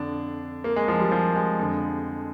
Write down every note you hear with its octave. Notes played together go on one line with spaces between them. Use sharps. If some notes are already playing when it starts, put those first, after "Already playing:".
Already playing: F2 D3 D4
A#3
G#3
F3
G3
F3
G#3
F2 D3